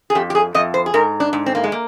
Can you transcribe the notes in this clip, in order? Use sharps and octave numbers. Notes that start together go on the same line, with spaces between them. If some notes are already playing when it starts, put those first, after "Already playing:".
G#4
F2 G4
G4
G#4
F2 D#5
C5
G#4
G#2 A#4
D4
G#2
C4
A#3
G#3
A#3